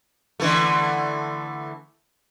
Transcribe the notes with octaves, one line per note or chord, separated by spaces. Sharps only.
D3 E3 A3